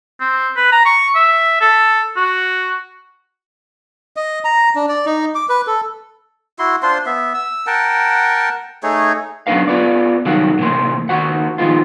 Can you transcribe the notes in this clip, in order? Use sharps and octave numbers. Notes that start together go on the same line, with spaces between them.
C4
B4
A#5
C#6
E5
A4
F#4
D#5
A#5
D4
D5
D#4
D6
B4
A4
E4 F#4 C6
D4 F4 C5 C6
B3 E5
E6
A#4 F#5 G5 A5
A3 D#4 G#4 C#5
F#3 B3 C4 D4 B4 F5
B3 F4 B4 D5
C2 D#3 F#3 F#4 F5
A2 C3 E3 A#3 C5
D#2 D#3 F#4 C5 F#5
D#3 F3 G#3 B3 F4